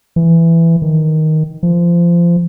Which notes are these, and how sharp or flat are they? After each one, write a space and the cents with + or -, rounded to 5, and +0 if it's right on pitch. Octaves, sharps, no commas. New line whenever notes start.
E3 +10
D#3 +5
F3 -25